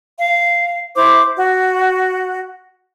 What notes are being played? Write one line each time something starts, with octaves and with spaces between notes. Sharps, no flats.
F5
E4 C5 D6
F#4